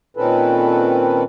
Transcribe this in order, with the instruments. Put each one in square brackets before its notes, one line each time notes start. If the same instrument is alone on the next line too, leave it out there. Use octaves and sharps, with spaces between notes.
[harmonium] A#2 D#3 C4 C#4 A4 B4